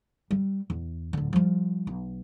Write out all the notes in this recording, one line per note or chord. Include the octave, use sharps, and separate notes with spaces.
G3
E2
D1 D3
F3 G3
B1